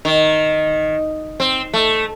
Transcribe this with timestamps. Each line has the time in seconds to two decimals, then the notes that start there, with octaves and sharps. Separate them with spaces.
0.05 D#3
1.40 C4
1.73 A3